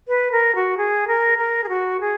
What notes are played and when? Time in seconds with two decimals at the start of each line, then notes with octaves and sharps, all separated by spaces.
0.08 B4
0.32 A#4
0.55 F#4
0.77 G#4
1.08 A#4
1.38 A#4
1.64 G#4
1.69 F#4
2.00 G#4